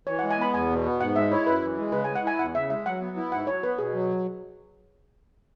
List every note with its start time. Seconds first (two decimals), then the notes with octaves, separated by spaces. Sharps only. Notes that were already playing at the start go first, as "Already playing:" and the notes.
0.07 E3 C#5
0.19 G#3 F#5
0.31 G#5
0.38 B3 B5
0.53 E2 G#5
0.69 B2
0.85 B3
1.00 G#2 F#5
1.16 G#3 E5
1.31 E4 C#5
1.46 F#2 B4
1.62 E3
1.78 G#3
1.92 C#3 B4
2.04 G#3 G#5
2.16 F#5
2.24 E4 G#5
2.39 E2 F#5
2.55 C#3 E5
2.70 G#3 E5
2.86 F#3 F#5
3.01 B3
3.17 E4
3.32 G#2 F#5
3.47 F#3 C#5
3.63 B3 B4
3.78 B2 G#4
3.93 F#3